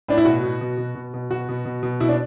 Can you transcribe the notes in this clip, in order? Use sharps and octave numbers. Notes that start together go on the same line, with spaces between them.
A2 D4
E4
B2 F#4
B2
B2
B2
B2
B2
B2 F#4
B2
B2
B2
B2 E4
D4